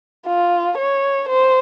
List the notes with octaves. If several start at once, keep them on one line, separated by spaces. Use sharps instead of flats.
F4
C#5
C5